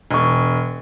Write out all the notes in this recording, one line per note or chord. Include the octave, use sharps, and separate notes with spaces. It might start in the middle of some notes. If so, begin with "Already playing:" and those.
E1 C#6